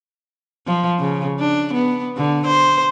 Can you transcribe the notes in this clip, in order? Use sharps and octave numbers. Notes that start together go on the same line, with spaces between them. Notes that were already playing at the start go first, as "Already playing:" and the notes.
F3
C#3
D4
B3
D3
C5